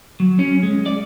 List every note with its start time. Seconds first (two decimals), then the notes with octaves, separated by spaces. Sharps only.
0.20 F#3
0.39 C#4
0.63 G#3
0.86 D5